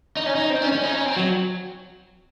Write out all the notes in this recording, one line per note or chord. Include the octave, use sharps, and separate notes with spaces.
D#4
C#4
D#4
C4
C#4
C#4
D#4
C#4
C4
F#3